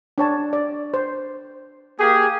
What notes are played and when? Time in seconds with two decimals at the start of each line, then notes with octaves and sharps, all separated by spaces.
0.18 D4 C#5 A5
0.53 D5
0.94 C5
1.99 A#3 G4 G#4